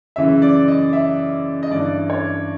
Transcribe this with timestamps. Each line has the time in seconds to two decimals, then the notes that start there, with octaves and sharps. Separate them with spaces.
0.16 F#2 C#3 E3 E5
0.42 D5
0.68 D#5
0.93 E5
1.63 D#5
1.70 G2 E3 D5
2.10 C#5